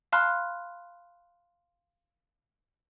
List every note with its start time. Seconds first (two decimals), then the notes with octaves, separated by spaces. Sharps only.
0.12 F5 A5 B5 C6 F6 F#6